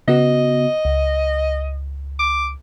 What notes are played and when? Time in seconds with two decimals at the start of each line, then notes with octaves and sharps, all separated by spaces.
0.08 C#3 B3 F#4 D#5
0.85 C#2
2.19 D6